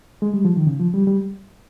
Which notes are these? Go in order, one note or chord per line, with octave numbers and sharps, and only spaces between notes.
G#3
G3
F3
D#3
C#3
F3
G3
G3